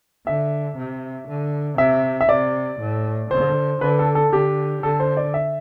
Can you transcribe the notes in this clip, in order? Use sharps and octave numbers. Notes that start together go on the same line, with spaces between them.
D3 E5
C3
D3
C3 E5
E5
C3 D5
A2
D3 C5
D3 B4
A4
A4
D3 G4
D3 A4
C5
D5
E5